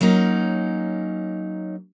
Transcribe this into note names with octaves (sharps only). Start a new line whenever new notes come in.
F#3 A#3 C#4 D#4